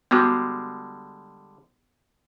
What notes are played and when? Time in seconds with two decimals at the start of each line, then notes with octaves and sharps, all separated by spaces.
0.11 D3 G3 G#3 B3 F#4